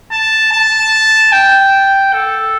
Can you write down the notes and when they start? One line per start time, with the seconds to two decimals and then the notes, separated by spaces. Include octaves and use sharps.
0.12 A5
0.52 A5
1.32 G5
2.13 A4